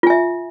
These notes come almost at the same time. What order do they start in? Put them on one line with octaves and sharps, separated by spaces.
F4 G#5 E5